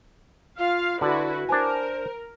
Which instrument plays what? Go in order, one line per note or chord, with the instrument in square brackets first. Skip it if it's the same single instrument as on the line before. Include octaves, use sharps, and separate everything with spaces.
[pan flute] F4 [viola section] F5
[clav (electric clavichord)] D3 [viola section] E4 F#4 B4 [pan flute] D5
[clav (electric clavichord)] D4 G#5 [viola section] A#4 [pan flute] C5